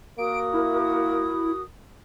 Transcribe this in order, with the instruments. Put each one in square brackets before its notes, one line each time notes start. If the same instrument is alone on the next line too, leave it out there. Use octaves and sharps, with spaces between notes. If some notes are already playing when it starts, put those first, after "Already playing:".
[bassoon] A#3 [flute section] F#4 A#4 D#6 [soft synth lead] D7
[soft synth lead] E4